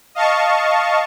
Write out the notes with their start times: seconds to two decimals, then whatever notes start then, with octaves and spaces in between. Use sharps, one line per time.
0.15 D#5 F5 A5 C#6